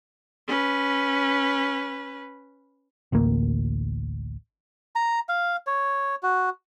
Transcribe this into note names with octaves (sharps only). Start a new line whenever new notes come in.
C#4 B4
A1 D2 A2 A#3
A#5
F5
C#5
F#4